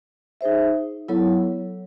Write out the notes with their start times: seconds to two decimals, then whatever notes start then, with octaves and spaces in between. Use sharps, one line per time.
0.41 D#4 G#4 C5 E5
1.08 F#3 B3 E4 A4 C#5